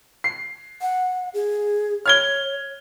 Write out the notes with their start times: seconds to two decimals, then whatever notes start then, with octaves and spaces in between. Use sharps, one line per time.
0.24 C7
0.81 F#5
1.34 G#4
2.06 C#5 F6 G#6 G7